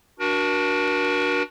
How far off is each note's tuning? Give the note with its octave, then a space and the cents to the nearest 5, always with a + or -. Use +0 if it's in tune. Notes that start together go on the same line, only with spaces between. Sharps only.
D4 +0 F#4 +0 A#4 +35